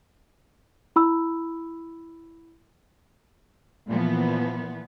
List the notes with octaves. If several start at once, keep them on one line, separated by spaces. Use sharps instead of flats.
E4 B5 E6
A#2 E3 F3 B3